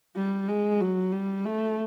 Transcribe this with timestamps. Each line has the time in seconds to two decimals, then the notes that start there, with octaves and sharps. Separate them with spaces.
0.17 G3
0.48 G#3
0.80 F#3
1.12 G3
1.45 A3